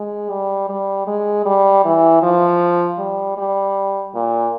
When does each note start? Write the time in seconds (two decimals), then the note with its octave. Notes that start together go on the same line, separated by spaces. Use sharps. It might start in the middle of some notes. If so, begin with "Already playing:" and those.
Already playing: G#3
0.30 G3
0.69 G3
1.07 G#3
1.45 G3
1.84 E3
2.22 F3
2.98 G3
3.37 G3
4.14 A#2